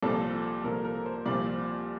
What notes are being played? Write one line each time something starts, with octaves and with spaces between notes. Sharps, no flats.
C2 A#2 F3 A4
C2 A#2 F3 A#4
A#4
C5
C2 A#2 F3 D5